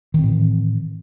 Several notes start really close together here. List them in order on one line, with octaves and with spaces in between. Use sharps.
D#3 C4 A2 E3